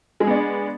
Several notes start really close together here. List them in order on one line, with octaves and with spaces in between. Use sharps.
G#3 G#4 B3 D4